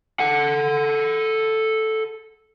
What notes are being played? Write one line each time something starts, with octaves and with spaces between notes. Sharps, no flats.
A4 F#5